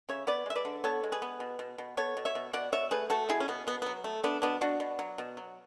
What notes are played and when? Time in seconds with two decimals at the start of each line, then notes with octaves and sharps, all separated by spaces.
0.09 C#3 C#5 E5
0.27 B3 B4 D5
0.46 G#3 E5
0.55 B4 D5
0.65 D3
0.84 B3 A4 C#5
1.03 G#3
1.12 G#4 B4
1.22 B3
1.40 B2
1.59 B2
1.78 B2
1.97 B3 A4 C#5
2.17 B2
2.25 C#5 E5
2.35 B2
2.53 B2 D5 F#5
2.72 B2 C#5 E5
2.91 A3 G#4 B4
3.10 A3 F#4 A4
3.29 B2 E4 G#4
3.40 C#4
3.48 B2 B3
3.67 B2 B3
3.82 F#3 B3
4.04 A3
4.23 A3 B3 D4
4.42 B2 B3 D4
4.61 B2 D4 F#4
4.80 B2
4.99 F#3
5.18 B2
5.37 F#3